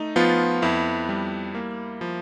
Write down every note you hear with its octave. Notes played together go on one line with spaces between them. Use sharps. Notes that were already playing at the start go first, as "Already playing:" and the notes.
Already playing: A3 D#4
F3 B3 F4
F2 E4
G3
A#3
F3